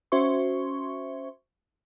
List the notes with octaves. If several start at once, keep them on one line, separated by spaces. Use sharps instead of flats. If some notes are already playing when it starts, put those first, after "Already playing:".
C#4 F#4 C5 E5 C6 C#6